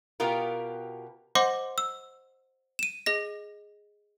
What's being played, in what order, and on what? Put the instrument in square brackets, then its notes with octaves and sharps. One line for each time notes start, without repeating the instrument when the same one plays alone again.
[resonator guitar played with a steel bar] B2 B3 F4 G4 A#4
[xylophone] C5 D#5 F#5 C6 D6
E6
D#7 E7
G#4 D#5 A#6